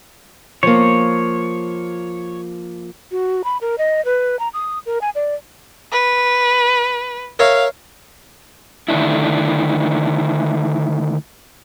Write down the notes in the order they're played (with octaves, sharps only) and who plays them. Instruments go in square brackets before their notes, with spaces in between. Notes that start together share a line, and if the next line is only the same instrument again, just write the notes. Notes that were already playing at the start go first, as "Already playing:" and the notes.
[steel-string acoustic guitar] F3 A#3 [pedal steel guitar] C#5
[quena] F#4
B5
A#4
D#5
B4
A#5
D#6
A#4
G#5
D5
[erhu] B4
[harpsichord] A#4 C#5 E5 [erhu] F5
[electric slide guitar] D3 D#3 A3 D4 E4